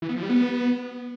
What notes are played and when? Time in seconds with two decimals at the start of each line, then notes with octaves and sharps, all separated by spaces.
0.02 E3
0.09 B3
0.16 F3
0.23 G3
0.29 B3